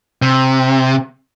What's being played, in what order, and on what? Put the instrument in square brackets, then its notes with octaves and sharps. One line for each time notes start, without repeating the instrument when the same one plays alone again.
[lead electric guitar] C3